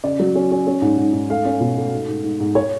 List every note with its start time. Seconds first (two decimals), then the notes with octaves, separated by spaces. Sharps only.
0.04 C#3 D5
0.19 F#3
0.35 C#4
0.51 C#4
0.67 C#4
0.82 G#2
0.98 G#2
1.13 G#2
1.30 A3 F5
1.45 C#4
1.60 B2
1.77 A3
1.92 G#2
2.08 G#2
2.24 G#2
2.40 G#2
2.55 C#5